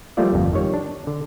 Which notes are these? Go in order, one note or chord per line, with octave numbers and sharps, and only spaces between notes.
F3 G3 A3 A#3 F4 D5
G1 F2
D#3 G3 C#5
D4
D3